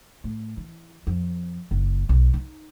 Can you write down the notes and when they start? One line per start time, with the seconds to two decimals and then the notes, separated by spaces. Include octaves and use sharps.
0.24 A2
0.57 E3
1.07 F2
1.71 F#1
2.09 B1
2.34 D#4